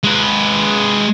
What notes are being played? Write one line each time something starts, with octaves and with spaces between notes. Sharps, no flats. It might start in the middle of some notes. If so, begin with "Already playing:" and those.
G#3 B4